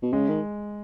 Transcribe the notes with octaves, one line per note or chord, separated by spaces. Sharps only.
B2
C#3 G#3
D#3